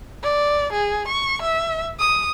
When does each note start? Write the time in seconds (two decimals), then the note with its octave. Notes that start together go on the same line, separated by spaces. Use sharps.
0.23 D5
0.73 G#4
1.08 C#6
1.42 E5
2.00 D#6